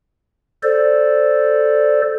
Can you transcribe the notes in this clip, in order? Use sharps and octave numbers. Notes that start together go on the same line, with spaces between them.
A4 C5 D5